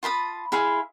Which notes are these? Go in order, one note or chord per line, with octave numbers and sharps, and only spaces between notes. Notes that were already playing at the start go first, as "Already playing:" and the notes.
F4 A5 B5 D#6
E4 G#4 F5 C6